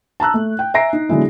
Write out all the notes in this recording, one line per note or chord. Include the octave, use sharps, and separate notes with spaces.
A5 A#5 E6 F#6
A3
G5
E5 G#5 A#5 A#6 C7 D7
D#4
B2 D3 F#3 G#3 E4